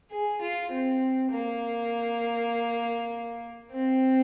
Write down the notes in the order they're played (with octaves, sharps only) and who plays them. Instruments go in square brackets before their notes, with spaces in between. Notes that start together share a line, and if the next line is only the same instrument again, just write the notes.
[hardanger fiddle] G#4
F4
C4
A#3
C4